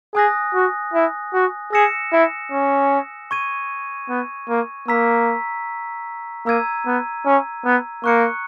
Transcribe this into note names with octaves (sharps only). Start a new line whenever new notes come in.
G#4 G#5 D#6 F#6 A#6
F#4
E4
F#4
G#4 E6 A#6 C#7 E7
E4
C#4
C#6 G#6 D#7
B3
A#3
A#3 A#5 E6 B6
A#3 A#5 E6 G#6 D#7
B3
C#4
B3
A#3 C#6 F#6 C#7